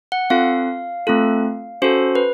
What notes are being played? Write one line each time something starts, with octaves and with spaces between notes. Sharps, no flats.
F#5
C4 F4 A4 F5
A3 C4 F4 A4
C#4 F#4 A4 C5
B4